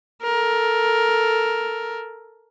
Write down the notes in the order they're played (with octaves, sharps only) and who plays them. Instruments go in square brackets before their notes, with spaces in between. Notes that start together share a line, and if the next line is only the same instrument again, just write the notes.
[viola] A4 A#4